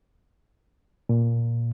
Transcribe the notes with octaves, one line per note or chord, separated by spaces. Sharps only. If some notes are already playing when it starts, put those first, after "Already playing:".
A#2